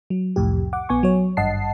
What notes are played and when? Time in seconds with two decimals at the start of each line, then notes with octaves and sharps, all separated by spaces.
0.10 F#3
0.36 C2 F2 A2 G4
0.73 F#5 D6
0.89 A#1 B3 G#5 C#6
1.03 F#3 C#5
1.37 G#1 G2 D#5 F#5 A5 C7